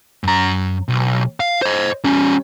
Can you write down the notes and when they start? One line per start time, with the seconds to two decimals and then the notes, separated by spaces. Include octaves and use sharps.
0.24 F#2 A#5
0.88 B1
1.40 F5
1.62 C5 D#5
2.05 G3 C#4